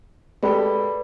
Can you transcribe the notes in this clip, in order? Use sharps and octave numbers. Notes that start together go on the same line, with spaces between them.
G#3 G4 A4 B4 D5 B5